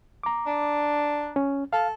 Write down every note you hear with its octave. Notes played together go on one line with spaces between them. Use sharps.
A#5 D6
D4
C#4
A4 F5